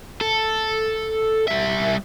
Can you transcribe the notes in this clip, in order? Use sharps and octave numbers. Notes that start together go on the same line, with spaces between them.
A4
G3 E5